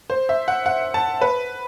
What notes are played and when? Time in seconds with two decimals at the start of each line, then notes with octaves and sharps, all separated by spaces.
0.10 C5
0.29 E5
0.48 F#5
0.66 F#5
0.94 A5
1.21 B4